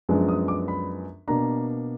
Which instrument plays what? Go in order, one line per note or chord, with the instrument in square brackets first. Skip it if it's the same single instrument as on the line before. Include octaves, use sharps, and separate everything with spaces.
[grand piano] F#2 F3 G#3 B3 D4
D#6
D6
B5
B2 A#3 D4 A#5